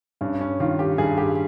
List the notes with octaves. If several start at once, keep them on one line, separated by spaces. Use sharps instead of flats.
G2 C#4
C#4
D#3 F4
G4
G2 G#4
G4